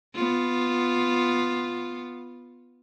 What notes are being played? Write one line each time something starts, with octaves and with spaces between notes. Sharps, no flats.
B3 F4